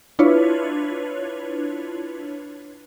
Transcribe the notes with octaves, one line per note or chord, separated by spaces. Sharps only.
D4 E4 F4 B4 C#5